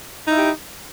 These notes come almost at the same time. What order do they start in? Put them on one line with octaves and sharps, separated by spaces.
D#4 E4 G4